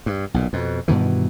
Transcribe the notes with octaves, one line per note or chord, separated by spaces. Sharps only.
G2
B1 A#2
F2 B2
G2 B2 D#3 E3